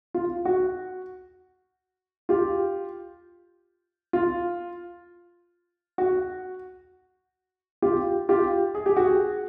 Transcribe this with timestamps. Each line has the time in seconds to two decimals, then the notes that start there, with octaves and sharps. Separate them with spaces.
0.14 F4
0.45 F#4
2.29 F4 G4
4.13 F4
5.98 F#4
7.82 F4 G4
8.29 F4 G4
8.75 G#4
8.86 G4
8.96 F#4 G#4